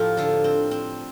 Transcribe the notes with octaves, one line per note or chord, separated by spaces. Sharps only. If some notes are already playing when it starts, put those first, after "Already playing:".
Already playing: A2 F3 A#3 F4 G4 A4
D3 D4
C4
C4